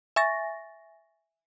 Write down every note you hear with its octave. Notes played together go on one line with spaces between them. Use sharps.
E5 G#5 C#6 A6 A#6